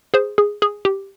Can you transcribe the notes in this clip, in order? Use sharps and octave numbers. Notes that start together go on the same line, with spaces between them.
G#4 C5
G#4
G#4
G4